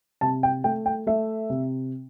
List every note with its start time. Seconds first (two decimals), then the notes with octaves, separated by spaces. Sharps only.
0.21 C3 A5
0.43 G5
0.64 A3 G5
0.86 G5
1.07 A3 E5
1.50 C3